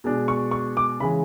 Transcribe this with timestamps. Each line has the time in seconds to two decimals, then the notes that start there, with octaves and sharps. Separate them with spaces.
0.04 B2 G#3 D4
0.28 C#6
0.51 C#6
0.77 D6
1.00 C#3 E3 G#3 B5